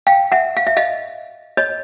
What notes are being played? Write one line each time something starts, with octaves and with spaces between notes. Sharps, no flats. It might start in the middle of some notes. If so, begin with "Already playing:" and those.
F5 G5
E5 F#5
F5
E5
D#5 F5
C#5 D#5